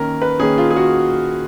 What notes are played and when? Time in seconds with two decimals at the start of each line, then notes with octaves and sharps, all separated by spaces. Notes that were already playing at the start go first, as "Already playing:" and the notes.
Already playing: D#3 A#3 C#4 A#4
0.22 B4
0.39 D#3 A#3 C#4 G#4
0.58 F4
0.71 G#4
0.76 F#4